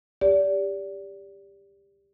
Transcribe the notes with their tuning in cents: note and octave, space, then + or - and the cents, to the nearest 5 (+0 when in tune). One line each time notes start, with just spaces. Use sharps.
G4 +20 D5 -25